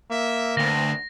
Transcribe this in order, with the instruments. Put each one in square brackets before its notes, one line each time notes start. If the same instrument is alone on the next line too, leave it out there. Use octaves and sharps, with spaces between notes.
[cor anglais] A#3 [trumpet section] E5
[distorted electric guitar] D2 [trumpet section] B3 C4 [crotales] A#6